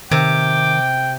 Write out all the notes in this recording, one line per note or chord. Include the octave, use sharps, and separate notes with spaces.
C3 D#3 G5 D6